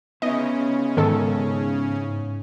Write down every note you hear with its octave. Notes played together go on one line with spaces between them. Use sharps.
C#3 B3 C#4 D#4 E4 D#5
G#2 D#3 A4